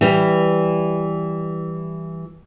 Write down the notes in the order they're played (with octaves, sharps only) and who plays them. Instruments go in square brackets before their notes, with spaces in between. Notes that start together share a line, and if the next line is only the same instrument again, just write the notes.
[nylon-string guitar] E3 G3